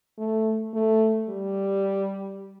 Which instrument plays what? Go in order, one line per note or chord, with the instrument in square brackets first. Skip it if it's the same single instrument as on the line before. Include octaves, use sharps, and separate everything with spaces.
[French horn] A3
A3
G3